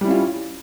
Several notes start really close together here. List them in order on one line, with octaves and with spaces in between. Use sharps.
G3 E4 C#4 F4